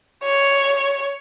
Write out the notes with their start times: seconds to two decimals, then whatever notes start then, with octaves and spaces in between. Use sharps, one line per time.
0.23 C#5